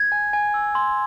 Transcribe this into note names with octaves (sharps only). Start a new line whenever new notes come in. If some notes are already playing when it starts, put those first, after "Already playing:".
Already playing: G#6
G#5
G#5
E6
C6